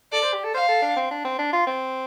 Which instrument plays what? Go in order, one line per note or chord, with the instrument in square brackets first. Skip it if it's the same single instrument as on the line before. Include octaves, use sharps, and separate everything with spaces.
[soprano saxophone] A4 [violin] D5
[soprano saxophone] C5
G4
A4
[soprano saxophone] C5 [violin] F5
[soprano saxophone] A4
D4
C4
D4
C4
D4
F4
C4